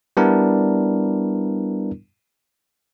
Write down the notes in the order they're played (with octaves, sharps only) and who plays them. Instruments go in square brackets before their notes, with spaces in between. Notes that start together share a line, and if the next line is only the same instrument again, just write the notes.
[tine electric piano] G3 B3 D4 E4 A#4